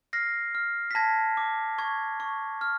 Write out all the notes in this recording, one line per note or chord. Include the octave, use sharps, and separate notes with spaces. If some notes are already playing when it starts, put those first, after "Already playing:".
F6 A#6 C7
F6
B6
A5 G#6 A#6
D6
C#6 G#6
C#6
F6